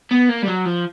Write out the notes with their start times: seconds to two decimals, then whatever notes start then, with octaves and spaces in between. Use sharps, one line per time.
0.11 B3
0.29 A#3
0.42 G3
0.48 F#3
0.65 F3